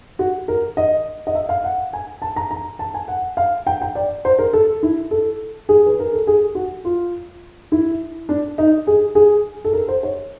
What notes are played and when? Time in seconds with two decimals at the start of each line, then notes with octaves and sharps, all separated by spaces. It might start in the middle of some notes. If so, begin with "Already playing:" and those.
0.19 F#4
0.48 A#4
0.77 D#5
1.27 D#5
1.35 E5
1.49 F5
1.64 F#5
1.93 G#5
2.22 A5
2.36 A#5
2.51 A#5
2.79 A5
2.94 G#5
3.08 F#5
3.37 F5
3.67 G5
3.81 G5
3.95 D5
4.25 C5
4.39 A#4
4.53 A4
4.83 E4
5.11 A4
5.69 G#4
5.86 B4
6.00 A#4
6.13 A4
6.27 G#4
6.55 F#4
6.85 F4
7.72 E4
8.29 D4
8.58 D#4
8.87 G#4
9.15 G#4
9.65 A4
9.73 A#4
9.88 C5
10.03 C#5